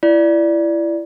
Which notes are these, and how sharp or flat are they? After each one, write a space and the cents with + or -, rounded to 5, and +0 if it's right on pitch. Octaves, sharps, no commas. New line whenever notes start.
E4 +25 D5 +0